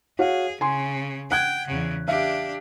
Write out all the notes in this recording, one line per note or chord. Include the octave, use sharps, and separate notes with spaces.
F#4 G#4 C#5 F5
C#3 G#5 C6
F#5 G5 F#6 G#6
E2 C#3
D4 G4 E5 F5